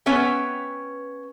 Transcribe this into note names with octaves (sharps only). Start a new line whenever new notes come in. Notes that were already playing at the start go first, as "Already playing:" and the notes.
B3 C#4 B4 E5 G5